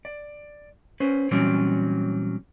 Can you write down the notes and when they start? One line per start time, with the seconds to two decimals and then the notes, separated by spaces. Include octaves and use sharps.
0.05 D5
1.00 C#4 B4 C5
1.31 A#2 E3 F#3 G3 C4 C#4